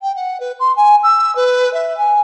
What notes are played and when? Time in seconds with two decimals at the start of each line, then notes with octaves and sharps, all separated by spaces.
0.01 G5
0.16 F#5
0.40 B4
0.60 C6
0.76 G#5
1.03 E6
1.36 B4
1.74 E5
1.97 G#5